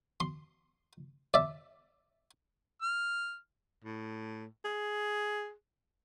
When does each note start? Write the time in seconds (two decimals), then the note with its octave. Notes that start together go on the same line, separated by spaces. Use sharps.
0.20 C6
1.34 D5 E5
2.82 F6
3.84 A2
4.64 G#4